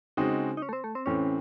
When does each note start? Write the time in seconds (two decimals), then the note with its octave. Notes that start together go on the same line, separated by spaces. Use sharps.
0.17 C#3 G#3 C4 D#4 F#4
0.57 D#4
0.62 C#4
0.69 A3
0.73 C4
0.84 A3
0.95 C4
1.06 A2 E3 C4 C#4